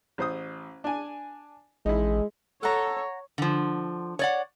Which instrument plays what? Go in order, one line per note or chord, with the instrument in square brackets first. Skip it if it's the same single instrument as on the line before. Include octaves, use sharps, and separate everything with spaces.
[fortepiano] A1 C5 D#6
D4 G#5
[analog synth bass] A1 [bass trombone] G#3 [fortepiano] D#4 E4
[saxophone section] A4 [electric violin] C#5 [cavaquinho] F#5 A#5
[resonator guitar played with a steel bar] D3 F3
C#5 D5 F#5